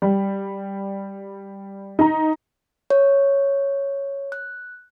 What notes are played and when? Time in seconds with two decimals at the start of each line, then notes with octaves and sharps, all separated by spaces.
0.02 G3
1.99 D#4 A#5
2.90 C#5
4.32 F#6